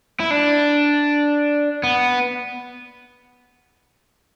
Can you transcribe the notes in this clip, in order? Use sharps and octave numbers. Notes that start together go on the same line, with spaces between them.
E4
D4
B3